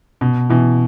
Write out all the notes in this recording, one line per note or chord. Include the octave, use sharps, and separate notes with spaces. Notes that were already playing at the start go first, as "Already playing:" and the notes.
B2
B2 E3